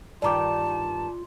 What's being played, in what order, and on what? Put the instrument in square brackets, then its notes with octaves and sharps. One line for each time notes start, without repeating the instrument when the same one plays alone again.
[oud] G2 D#3 G4 [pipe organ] F4 [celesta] D5 A#5 D6 [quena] A5